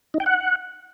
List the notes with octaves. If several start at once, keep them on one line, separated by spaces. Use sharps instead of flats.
D#4
G5
F#5